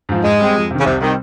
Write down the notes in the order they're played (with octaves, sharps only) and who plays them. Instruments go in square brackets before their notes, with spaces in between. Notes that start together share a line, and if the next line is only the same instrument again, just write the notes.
[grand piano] G#2 F3
[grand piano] G#2 [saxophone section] G#3
[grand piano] G3 C4 G4
F2
C3 D#3
[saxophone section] C#3
[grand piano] C2 [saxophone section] C3
[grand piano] C3 G3 C4 [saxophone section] D#3